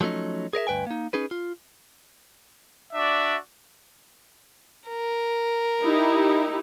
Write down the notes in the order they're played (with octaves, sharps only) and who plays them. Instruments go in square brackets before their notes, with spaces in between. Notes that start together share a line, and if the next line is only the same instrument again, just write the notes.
[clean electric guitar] F3 F#3 A3 C#4 D#4
G#4 A#4 D5 E5
D2 G2 B4 G5 G#5
A#3 D#4
C#4 D#4 G#4 B4
F4
[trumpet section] D4 F#4 D5 E5
[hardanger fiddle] A#4
[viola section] D#4 E4 G4